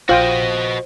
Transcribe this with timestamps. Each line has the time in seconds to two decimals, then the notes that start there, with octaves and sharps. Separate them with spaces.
0.09 A#1 F4 F#4 C5 D#5 G5